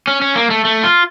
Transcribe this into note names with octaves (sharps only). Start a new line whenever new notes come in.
C#4
C#4
A#3
A3
A3
F4